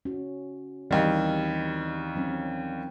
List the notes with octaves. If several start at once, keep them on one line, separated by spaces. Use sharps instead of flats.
C#4 F#4
D#2 E3 G3 C4 D#5
F#3 C4 C#4